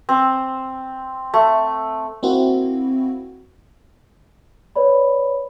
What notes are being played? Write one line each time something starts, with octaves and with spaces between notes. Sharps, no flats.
C4
A3
A#3 C4 E4 F#4
B4 C#5 D5 B5